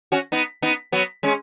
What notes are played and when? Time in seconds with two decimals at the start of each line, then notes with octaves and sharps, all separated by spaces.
0.12 C#4 F#4
0.32 B3 D#4
0.62 B3 D#4
0.92 F#3 B3
1.23 G#3 C#4